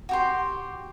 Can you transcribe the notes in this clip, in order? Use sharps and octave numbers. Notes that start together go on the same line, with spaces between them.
F#4 G4 C6